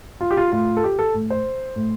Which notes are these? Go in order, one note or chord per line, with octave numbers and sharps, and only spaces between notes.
F4
G4
F4
A2 F4
A4
G4
A4
A2
C5
A2